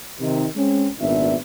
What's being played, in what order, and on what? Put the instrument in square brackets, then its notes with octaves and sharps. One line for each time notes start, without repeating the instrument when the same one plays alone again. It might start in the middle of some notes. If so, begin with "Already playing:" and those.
[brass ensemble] C3 D#3
G#3 C4 C#4
G#1 A#2 B3 D4 E5